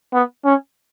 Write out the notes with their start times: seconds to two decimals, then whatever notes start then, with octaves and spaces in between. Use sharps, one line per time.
0.13 B3
0.45 C#4